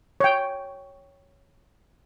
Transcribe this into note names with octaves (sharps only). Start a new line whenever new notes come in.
C#5 G5